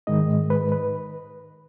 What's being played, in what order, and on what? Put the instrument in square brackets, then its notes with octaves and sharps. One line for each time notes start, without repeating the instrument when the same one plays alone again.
[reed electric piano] G#2 D#3 G#3 D#4 D#5
B4
B4